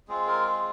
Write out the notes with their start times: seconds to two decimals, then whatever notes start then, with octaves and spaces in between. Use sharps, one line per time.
0.08 G#3 C4 F4 G#4
0.27 A#4
0.45 G#4